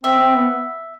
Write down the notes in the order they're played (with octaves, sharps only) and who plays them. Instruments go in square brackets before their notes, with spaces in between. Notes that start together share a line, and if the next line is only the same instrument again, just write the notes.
[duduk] C4 [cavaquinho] E5
[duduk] C4
B3